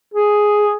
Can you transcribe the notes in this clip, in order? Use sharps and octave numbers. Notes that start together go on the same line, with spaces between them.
G#4